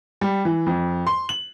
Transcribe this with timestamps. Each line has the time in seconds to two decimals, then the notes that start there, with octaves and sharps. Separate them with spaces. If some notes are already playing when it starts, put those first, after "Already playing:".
0.21 G3
0.45 E3
0.66 F2
1.07 C6
1.29 F#7